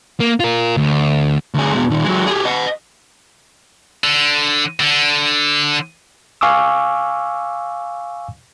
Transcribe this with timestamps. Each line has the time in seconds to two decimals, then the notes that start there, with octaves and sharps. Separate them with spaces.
0.20 A#3
0.40 F4 A#4
0.77 D2
1.54 D2 G#4
1.72 B2 G#3
1.90 A#2 D#3
2.04 F#3 G#3
2.26 G4 G#4
2.45 D#5 F#5
4.04 D3
4.80 D3
6.41 F5 G#5 C#6 D6 E6